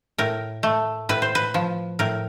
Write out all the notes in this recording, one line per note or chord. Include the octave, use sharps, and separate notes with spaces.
A2 A#4
A3
A2 B4
C5
B4
F3
A2 A#4